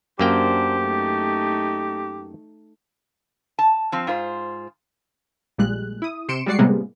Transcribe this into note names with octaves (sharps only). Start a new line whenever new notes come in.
F#2 A#3 D4 G4 C5 G5
A3 D#4
A5
F3 C4
G#2 F4 C5
A#1 A#2 G3 G#3 F#6
E4 D#6
C3 C6 C#7 D7 E7
G3 G#3 F#4 D5 C7 C#7
A2 C3 G3 G#3 A#3 B3